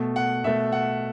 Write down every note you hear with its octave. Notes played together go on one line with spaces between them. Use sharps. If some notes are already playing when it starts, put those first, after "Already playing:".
Already playing: B2 A3
F#5
B2 A3 E5
F#5